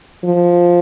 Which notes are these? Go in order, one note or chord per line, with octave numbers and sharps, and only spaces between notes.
F3